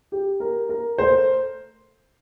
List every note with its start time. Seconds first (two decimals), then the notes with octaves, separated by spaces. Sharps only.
0.12 G4
0.40 A#4
0.69 A#4
0.98 A3 C5